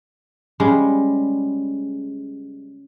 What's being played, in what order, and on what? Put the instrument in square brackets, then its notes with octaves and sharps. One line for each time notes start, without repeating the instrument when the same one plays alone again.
[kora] C#3 G3 G#3